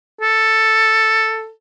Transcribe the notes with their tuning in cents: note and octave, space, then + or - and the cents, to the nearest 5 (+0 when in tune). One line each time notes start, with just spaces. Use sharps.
A4 +5